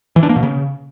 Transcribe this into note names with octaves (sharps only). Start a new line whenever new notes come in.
E3
D4
A#3
B2
C#3